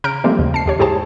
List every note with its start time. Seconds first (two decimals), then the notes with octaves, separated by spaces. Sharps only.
0.04 C#3 A#5 F6 G6 D7
0.24 E3 F3 G3 A3 A#3 C4
0.39 D#2 C#3
0.54 A5 C7
0.66 D#2 G4 C#5
0.79 G#2 E4 G4 G#4 C5 A5